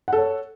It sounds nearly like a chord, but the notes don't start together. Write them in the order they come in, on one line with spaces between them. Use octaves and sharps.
F#5 A4 C#5